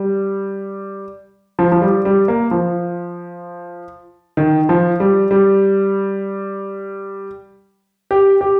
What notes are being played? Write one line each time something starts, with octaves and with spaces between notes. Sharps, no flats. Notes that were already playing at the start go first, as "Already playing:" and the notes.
Already playing: G3
F3
F3
G3
G3
A#3
F3
D#3
F3
G3
G3
G4
G4